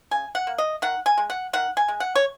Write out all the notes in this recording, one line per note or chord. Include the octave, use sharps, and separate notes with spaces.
C#3 G#5
F#5
A#3
D#5
D#3 F#5
G#5
G#3
F#5
D#3 F#5
G#5
G#3
F#5
C#5